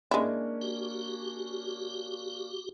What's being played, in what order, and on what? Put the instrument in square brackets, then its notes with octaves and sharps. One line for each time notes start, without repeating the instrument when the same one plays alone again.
[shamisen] G#3 E4 [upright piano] A#3 C#4 D4
[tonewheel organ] F#4 G4